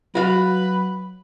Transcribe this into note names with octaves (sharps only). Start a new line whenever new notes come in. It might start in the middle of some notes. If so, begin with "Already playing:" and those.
F#3 F#4 B4 F5